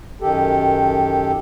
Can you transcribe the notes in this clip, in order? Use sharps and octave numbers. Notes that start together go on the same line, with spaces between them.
F#2 D#3 G4 A4